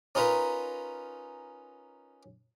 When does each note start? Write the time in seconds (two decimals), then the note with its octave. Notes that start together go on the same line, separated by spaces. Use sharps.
0.15 C#4 D#4 F4 A#4 B4